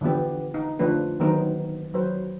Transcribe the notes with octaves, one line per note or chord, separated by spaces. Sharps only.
D3 E3 F3 B3 G4
D#4
D3 F3 A3 D4 B4
D#3 F#3 B3 D#4 A#4 C5
F#3 B4 C5